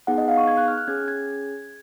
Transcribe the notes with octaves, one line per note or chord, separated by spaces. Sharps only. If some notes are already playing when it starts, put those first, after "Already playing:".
B3 D#4 G#4 F#5
D#5
F5
C#6
G#6
F#6
F6
F#6
C#4 G#4 G#6
G#6